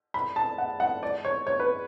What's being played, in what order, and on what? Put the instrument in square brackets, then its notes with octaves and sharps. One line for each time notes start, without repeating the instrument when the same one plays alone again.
[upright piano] B5
A5
F#5
F#5
D5
C#5
C#5
B4